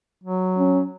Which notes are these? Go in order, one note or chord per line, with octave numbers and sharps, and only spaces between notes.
F#3
C#4